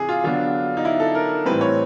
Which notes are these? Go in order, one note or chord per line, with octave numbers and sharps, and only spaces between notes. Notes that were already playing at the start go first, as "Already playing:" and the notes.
Already playing: C3 E3 G#4
F4
D3 F#3 B3 D4 F4
D#4
E4
A4
A#4
A2 E3 G3 C4 B4
C#5